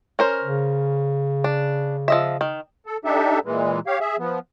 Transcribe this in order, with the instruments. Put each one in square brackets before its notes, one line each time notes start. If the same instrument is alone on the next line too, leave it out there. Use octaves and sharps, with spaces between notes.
[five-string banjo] C#4 A#4 C5
[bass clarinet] C#3
[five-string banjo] D4
F3 D#5 E5
D#3
[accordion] A4
D4 D#4 G4 A4 E5
A#2 E3 G#3
G4 C#5 F5
G#4 E5
F3 B3